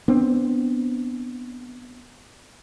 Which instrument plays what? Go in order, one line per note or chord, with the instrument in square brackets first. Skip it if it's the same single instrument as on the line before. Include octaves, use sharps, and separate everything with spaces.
[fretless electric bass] B3 C4 D4